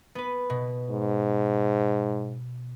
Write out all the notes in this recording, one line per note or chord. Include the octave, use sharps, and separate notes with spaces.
B3 B4
B2
G#2